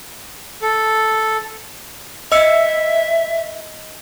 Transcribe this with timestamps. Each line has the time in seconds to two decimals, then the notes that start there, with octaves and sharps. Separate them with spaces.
0.62 A4
2.32 D#5 E5 E6 C#7